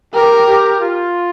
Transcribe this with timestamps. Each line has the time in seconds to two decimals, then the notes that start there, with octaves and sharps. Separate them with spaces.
0.14 G4 A#4
0.46 G4
0.78 F4